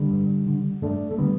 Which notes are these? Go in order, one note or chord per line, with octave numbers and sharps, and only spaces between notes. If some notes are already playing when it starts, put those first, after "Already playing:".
Already playing: D3 G3
G2
D3
G2 A3 D4
A3
D3 G3 B3